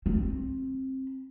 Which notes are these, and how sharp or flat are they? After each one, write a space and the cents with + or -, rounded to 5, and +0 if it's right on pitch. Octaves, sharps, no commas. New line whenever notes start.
C4 +20